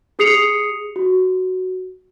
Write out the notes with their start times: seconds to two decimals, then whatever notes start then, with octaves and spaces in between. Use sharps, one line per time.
0.19 G4 G#4 D#6 C7 C#7 F7
0.96 F#4